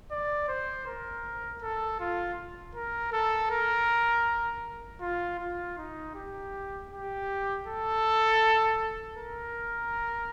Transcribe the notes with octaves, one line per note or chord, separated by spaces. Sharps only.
D5
C5
A#4
A4
F4
A#4
A4
A#4
F4
F4
D#4
G4
G4
A4
A#4